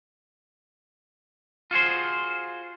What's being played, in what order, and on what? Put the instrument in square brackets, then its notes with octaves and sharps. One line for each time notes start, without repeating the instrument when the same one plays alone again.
[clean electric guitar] F4 F#4 G#4 C5